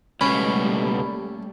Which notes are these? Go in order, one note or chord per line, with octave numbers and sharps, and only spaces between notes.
C#2 B2 G3 A3 A#3 C#4 B5